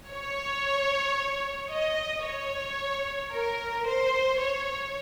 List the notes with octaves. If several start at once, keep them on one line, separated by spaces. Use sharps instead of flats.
C#5
D#5
C#5
A#4
C5
C#5